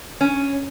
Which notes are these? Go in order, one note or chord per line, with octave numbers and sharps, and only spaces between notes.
C#4